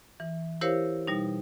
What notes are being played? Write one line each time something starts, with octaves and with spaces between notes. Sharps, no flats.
E3
E4 G4 A#4 C5 C#5 F5
B2 G3 D#4